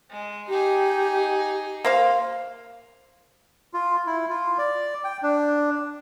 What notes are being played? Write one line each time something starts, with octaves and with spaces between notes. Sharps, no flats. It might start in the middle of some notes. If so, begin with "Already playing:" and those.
G#3
D#4 G4 G#4
A#3 C5 F5
F4
E4
F4
D5
G5
D4